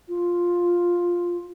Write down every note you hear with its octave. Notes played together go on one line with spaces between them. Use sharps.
F4